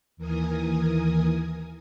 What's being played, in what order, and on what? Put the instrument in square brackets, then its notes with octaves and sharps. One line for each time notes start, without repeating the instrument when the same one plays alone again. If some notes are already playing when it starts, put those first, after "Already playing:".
[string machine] D#2 E3 A#4 G#5 D#6